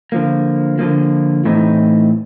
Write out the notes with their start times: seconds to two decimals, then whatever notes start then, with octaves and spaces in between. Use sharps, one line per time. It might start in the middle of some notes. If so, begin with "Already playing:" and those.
0.12 D3 F3 A#3
0.79 D3 F3 A#3
1.45 A2 E3 A3 C4 D#4